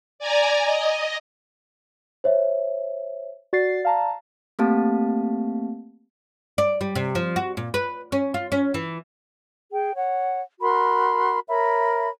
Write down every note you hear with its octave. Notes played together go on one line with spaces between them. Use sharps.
D5 G#5 A#5
D#5
C5 C#5 E5
F#4 D5 A6 C7
F5 A5 A#5
A3 A#3 C4 G4 F5 A5
D5
G3
C3
F3
F#4
A#2
B4
C#4
F4
C#4
E3
G#4 G5
C#5 F#5
F#4 A#4 B5 C6
A#4 C#5 E5 B5